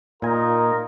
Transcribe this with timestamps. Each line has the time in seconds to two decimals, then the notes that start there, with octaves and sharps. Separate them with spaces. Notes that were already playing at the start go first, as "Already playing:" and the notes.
0.22 A#2 D#4 F4 A#4 G#5 A#5